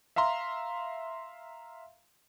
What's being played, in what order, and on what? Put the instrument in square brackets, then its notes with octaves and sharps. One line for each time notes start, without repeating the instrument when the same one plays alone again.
[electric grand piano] E5 F5 A#5 C6